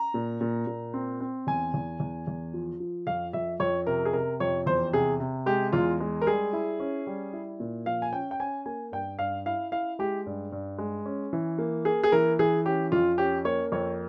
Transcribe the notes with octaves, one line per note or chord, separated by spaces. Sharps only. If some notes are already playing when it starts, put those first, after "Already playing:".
Already playing: A#5
A#2
A#2
A#2
C4
C4
E2 G#5
E2
E2
E2
F3
F3
F2 F5
F2 E5
F2 C#5
C3 A#4
G#4
C3 A#4
F2 C#5
E2 C5
C3 G#4
C3
G#3 G4
E2 F4
G#3
A#4
G3 G#4
E4
C#4
G3
E4
A#2
F3 F5
G#5
C#4 G5
G5
C#4 G#5
A#3 G#5
G2 G5
G2 F5
E4 F5
E4 F5
G#3 G4
G2
G2
G#3
C#4
E3
A#3
A#3 G#4
G#4
E3 A#4
E3 G#4
C#4 G4
F2 F4
C#4 G4
A#3 C#5
F2 C#5